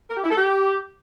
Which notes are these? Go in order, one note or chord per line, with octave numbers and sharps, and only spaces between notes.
A#4
G4
E4
A4
G4